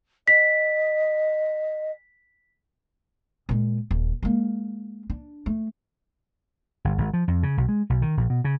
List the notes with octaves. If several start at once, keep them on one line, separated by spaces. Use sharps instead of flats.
D#5 B6
A#2 G#3
D#1
G#3 A#3
D4
A3
G1
G#1
F3
F2
C#3
B1
G#3
B1
D#3
A#1
B2
C#3